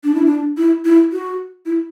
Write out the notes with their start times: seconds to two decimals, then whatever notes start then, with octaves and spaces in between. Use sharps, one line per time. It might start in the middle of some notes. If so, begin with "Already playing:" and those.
0.04 D4
0.15 E4
0.26 D4
0.57 E4
0.85 E4
1.12 F#4
1.66 E4